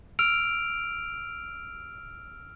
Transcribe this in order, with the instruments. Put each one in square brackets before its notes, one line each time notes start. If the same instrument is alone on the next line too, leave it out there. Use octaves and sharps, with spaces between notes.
[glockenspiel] E6 F6 D7 F7